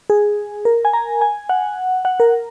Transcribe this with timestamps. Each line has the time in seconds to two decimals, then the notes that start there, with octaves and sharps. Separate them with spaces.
0.10 G#4
0.65 A#4
0.85 G#5
0.93 A#5
1.21 G#5
1.49 F#5
2.05 F#5
2.20 A#4